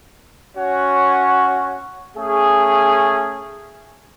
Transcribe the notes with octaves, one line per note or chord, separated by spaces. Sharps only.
C#4 F#4 C#5 F#5
A3 C#4 G#4